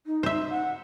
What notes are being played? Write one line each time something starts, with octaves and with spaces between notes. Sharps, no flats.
D#4
C5 E5
F#5